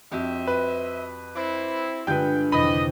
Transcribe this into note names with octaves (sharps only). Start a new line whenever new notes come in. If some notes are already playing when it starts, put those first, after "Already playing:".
F2 F#4 G4 C5 D#5 E5
B4
C4 E4 D6
G2 D3 G#3 F4 B4 G5 G6
G#1 F2 C3 E3 D#5 B5